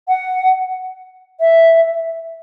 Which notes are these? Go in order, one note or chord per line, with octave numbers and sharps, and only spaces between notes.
F#5
E5